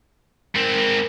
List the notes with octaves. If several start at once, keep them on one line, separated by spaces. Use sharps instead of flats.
G#2 C4 A#4